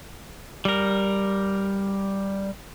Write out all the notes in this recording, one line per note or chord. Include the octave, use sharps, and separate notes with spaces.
G3 A#4